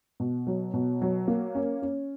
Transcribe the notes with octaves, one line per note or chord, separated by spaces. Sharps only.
B2
F#3
B2
F#3
A#3
C#4
C#4